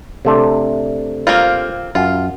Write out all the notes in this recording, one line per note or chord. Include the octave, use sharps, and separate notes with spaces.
C3 A3 D4
A#3 C4 F4
F#2 F4